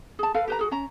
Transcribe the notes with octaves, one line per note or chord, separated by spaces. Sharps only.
G#4 A5
A4 B4 F5 B5
G4 B4 A#5
F#4 G#4 A#4
C#4 A#5